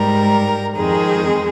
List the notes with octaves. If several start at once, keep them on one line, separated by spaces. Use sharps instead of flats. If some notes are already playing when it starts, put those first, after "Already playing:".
Already playing: G#2 G3 A#4
F2 D#3 G#3 G#4